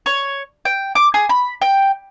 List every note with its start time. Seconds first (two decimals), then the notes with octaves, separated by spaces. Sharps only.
0.06 C#5
0.65 G5
0.95 D6
1.14 G#4
1.29 B5
1.62 G5